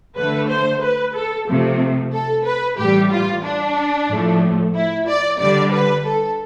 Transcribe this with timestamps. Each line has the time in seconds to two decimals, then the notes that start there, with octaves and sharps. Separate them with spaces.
0.17 D3 A3 B4
0.49 C5
0.82 B4
1.15 A4
1.47 C3 F3 A3
2.13 A4
2.45 B4
2.78 A2 E3 G3 G4
3.11 F4
3.44 D4
4.09 A2 F3 A3
4.74 E4
5.08 D5
5.40 D3 G3 D5
5.73 B4
6.05 A4